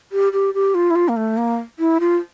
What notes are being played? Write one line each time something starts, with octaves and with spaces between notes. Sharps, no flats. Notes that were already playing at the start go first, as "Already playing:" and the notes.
G4
G4
G4
F4
E4
F4
A#3
A3
A#3
E4
F4